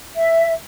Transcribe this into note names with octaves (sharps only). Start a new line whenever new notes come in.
E5